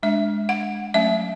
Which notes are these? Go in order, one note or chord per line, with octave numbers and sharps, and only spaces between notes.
G#3 D4 E5
F#5
F#3 A3 C#4 E5